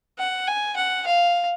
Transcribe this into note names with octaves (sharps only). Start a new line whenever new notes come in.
F#5
G#5
F#5
F5